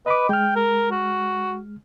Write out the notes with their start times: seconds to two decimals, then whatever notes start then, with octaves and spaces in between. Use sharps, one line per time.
0.06 B4 D#5 B5 D6
0.29 G#3 G5 F6
0.56 A#4
0.91 F#4